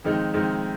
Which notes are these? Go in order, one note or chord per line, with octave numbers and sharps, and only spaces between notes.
F2 D#3 G#3 D#4
F2 D#3 G#3 D#4